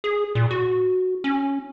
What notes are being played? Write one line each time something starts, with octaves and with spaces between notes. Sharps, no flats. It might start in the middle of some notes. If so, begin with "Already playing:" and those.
G#4
A#2
F#4
C#4